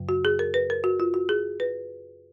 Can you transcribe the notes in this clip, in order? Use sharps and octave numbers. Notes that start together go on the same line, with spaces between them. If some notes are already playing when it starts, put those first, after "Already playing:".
Already playing: F#2 C#3 F#3
F#4
G#4
A#4
B4
A#4
F#4
F4
F#4
G#4
B4